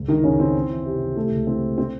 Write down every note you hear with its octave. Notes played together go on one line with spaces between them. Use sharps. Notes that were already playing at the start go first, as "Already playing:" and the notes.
Already playing: C#2
D#3 E3 D#4
C#2 C#3 C#4
E3 C4
E3
E3
C3
E3
C3 A3
C#2
E3 C4
C3
C4